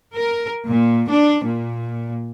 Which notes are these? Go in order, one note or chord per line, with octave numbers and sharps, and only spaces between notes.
A#4
A#2
D4
A#2